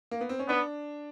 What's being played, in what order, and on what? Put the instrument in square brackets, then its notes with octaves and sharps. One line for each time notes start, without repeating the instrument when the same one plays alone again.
[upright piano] A#3
B3
C4
C#4
[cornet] B3 [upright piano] D4